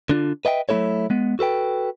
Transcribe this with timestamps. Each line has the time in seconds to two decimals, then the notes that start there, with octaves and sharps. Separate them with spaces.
0.09 D3 D4 F4
0.45 B4 D#5 E5 G5
0.69 F#3 A3 A#3 E4 A4 C#5
1.10 G#3 B3
1.39 F#4 A4 B4 G5